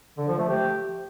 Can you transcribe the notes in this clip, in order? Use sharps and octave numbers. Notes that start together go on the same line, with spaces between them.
D3
F3
A3
G4